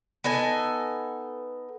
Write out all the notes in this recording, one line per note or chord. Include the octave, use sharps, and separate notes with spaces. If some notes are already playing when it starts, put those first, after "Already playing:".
B3 D#4 A4 G#5